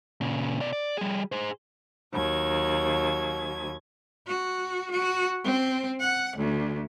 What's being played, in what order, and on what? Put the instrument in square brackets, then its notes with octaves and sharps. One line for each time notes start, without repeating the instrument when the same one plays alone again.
[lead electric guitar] A#2 C#3
B2 D5
D5
G3 G#4
G#4 C5
[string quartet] D#2 F#3 G#6
[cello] F#4
F#4
C4
F#5
D2